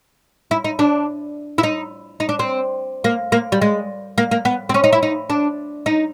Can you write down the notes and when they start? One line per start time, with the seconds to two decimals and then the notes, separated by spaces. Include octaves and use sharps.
0.51 E4
0.64 D#4
0.79 D4
1.58 E4
1.63 D#4
2.20 D#4
2.29 D4
2.39 C4
3.04 A#3
3.32 A#3
3.52 G3
3.62 G#3
4.18 A#3
4.31 A#3
4.45 B3
4.69 C4
4.74 C#4
4.84 D#4
4.93 E4
5.03 D#4
5.30 D4
5.86 D#4